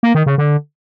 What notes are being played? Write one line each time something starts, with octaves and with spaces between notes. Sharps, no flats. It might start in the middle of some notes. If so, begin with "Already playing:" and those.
A#3
D#3
C#3
D3